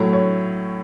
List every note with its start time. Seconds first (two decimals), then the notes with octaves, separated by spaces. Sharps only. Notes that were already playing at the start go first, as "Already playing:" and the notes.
Already playing: A2 F#3 A3 E4 C#5
0.13 C#5